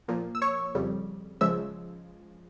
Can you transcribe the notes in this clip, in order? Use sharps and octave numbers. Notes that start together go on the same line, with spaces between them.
A#2 F3 A#3
E6
C#5 C#6
F2 C#3 G3
C#2 C#3 F3 G#3 E5 E6